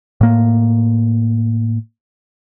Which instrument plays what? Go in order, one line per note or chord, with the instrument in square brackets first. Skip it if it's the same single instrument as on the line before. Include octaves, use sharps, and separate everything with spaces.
[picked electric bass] A2 A#3